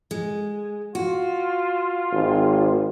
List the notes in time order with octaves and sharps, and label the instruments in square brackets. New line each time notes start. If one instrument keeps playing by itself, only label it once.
[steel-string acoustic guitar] G#3
[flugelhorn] F4 [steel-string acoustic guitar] F#4
[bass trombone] G#1